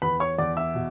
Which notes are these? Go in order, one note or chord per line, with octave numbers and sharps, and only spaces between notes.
E2 B4 B5
C#5 C#6
E2 D5 D6
E5 E6
B2